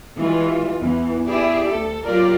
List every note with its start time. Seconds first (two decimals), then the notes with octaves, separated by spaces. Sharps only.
0.17 E3 G3 G#3 F4
0.80 E2 E3
1.27 E4 G4 G#4 D5 E5
1.69 D2 A4
2.05 F#3 F4 G4 A#4 D5